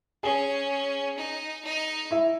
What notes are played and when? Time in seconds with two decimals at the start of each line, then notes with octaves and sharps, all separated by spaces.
0.23 C#4 G#4 G#5
1.17 D#4
1.64 D#4
2.11 E4 E5